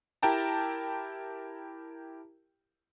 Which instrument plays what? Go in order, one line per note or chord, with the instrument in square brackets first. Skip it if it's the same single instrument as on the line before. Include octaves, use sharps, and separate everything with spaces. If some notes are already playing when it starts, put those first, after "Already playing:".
[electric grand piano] E4 G4 A#4 G5 A5 A#5